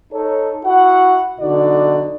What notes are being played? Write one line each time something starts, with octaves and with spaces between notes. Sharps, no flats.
D#4 A4 C#5
E4 F#4 F#5
B1 D3 D#4 F#4 D5